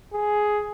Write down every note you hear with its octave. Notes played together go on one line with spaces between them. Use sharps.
G#4